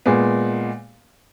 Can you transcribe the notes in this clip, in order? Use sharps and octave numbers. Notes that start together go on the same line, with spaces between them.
A#2 G#3 B3